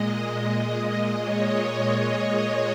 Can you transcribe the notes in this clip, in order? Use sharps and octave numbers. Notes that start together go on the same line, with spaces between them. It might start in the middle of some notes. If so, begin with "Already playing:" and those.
Already playing: A#2 G#3 D#5
C#5
C#5
D#5